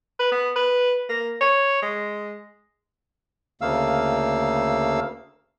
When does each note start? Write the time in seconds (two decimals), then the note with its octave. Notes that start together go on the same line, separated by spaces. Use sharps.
0.19 B4
0.32 B3
0.56 B4
1.09 A#3
1.41 C#5
1.82 G#3
3.61 D2 C#3 A3 A#3 F5 E6